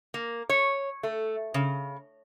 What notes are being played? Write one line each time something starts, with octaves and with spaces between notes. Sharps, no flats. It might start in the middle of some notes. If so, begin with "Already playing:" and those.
A#3
C#5
A3
C#3